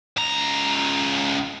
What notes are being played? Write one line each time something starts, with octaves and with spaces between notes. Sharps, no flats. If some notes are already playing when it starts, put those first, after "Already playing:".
C#2 A#5